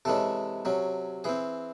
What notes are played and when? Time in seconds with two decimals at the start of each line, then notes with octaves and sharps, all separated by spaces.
0.05 C3 E3 G#3 C#4 A4
0.65 C3 F#3 C#4
1.24 E3 C4 G#4